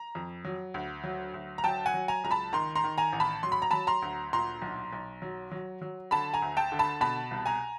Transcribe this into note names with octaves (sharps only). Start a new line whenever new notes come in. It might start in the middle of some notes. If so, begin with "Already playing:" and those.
Already playing: A#5
F2
F#3
D2
F#3
D2
A#5
F#3 G5 A5
F#5 G#5
F#3
G#5 A#5
C#2 A#5
A5 B5
D#3 A#5 C6
A#5 C6
D#3
G#5 A#5
A1
A5 B5
F#3 C6
B5
A#5
F#3 A5 B5
A#5 C6
D2
A#2 A#5 C6
B1
B1
F#3
F#3
F#3
D3 A5 B5
G#5 A#5
D2
G5 A5
D3
A5 B5
B2 A5 B5
C2
G#5 A#5